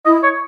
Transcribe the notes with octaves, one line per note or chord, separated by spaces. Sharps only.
E4 D#5
C#5